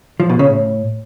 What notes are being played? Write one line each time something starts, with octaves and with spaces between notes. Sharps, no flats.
F3
B2
C#3
A2